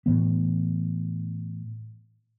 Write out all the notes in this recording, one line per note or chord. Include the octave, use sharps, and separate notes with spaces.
A2 E3 B3